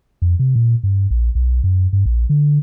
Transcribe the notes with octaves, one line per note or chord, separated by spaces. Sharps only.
F2
C3
A#2
G2
A#1
B1
F#2
G2
A#1
D3